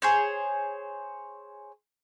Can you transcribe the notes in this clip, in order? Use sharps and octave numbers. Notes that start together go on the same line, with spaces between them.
G#4 C5 C#5